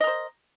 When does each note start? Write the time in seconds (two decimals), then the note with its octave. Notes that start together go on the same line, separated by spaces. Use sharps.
0.01 D#5
0.04 A#4
0.07 C5